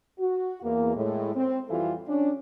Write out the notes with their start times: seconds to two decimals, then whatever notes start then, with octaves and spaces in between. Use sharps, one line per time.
0.19 F#4
0.63 E2 A#3
0.95 A2 G#3
1.36 C4
1.69 F2 E3 G3 F4 F#4 A4
2.08 C#4 D4